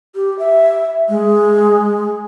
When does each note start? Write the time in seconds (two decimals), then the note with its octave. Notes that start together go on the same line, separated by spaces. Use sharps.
0.15 G4
0.39 E5
1.09 G#3